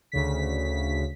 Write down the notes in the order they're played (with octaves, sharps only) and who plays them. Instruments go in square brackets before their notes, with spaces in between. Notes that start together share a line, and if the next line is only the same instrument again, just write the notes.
[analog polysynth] D2 C#3 B6